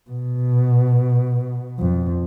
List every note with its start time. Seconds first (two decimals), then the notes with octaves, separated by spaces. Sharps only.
0.10 B2
1.79 F2